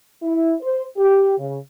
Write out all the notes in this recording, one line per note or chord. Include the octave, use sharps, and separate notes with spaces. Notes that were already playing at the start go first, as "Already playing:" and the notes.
E4
C5
G4
C#3